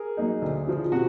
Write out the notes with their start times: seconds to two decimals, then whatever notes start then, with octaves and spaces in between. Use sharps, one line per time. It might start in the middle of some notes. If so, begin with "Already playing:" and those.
Already playing: G#4 A#4
0.17 F#3 A#3 D#4
0.42 D2
0.67 C#3 F3
0.92 C3 F#4